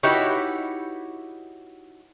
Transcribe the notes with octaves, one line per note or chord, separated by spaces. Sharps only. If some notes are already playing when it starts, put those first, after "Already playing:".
D#4 E4 F#4 G4 B4 C#5